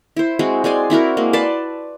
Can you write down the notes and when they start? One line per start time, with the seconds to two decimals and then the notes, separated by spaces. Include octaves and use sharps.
0.17 E4 C5
0.39 G#3 C4 F#4
0.64 G#3 D5 G#5 C6
0.90 C4 E4 F#4 A#4
1.17 G#3 A#3
1.33 B4 D5 A5 C6